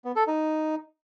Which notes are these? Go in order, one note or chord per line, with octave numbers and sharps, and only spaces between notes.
B3
A4
D#4